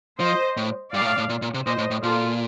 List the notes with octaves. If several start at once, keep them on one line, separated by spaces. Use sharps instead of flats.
F3 C5 D#5
A2
G2 D5 F5
A#2
A2
A2
A#2
A#2
C3
A#2 C5 D#5
A2
A2
A#2 F4 A4